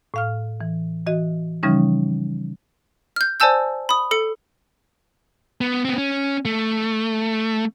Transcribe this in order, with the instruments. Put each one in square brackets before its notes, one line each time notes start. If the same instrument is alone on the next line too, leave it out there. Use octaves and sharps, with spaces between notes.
[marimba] A2 F5 F6
E3
E3 F#4 D#5
C#3 E3 F3 G3 C#4 D#4
[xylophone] F6 G6
C5 D5 G#5 A5 E6 G6
B5 D#6
A4 C#7
[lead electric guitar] B3
B3 C4
C#4
A3